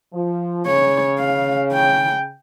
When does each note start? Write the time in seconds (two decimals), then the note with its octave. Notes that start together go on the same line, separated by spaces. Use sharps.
0.13 F3
0.66 C#3 C#5
1.19 F5
1.72 G5